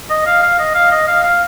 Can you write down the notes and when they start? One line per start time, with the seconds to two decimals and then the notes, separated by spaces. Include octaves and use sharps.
0.10 D#5
0.26 F5
0.43 F5
0.59 D#5
0.74 F5
0.92 D#5
1.08 F5
1.24 F5